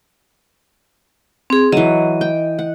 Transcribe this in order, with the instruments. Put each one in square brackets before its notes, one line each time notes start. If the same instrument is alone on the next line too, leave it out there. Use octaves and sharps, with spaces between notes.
[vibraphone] C4 G#4
[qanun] E3 F#3 [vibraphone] D#5
[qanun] G5
F#5